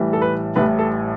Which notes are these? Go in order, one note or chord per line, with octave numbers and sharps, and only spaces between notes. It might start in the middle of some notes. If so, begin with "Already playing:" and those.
Already playing: A1 A2 E3 G3
A4
B4
A1 A2 E3 G3 B4
A4